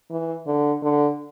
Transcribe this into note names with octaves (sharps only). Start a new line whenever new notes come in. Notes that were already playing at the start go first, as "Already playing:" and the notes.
E3
D3
D3